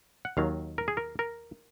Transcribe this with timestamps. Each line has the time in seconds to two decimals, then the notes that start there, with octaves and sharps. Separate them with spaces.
0.25 F#5
0.37 D#2 D#3 F#3 F5
0.78 A#4
0.88 G#4
0.97 A#4
1.19 A#4